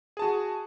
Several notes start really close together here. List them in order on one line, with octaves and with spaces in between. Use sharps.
G#4 A5 F#4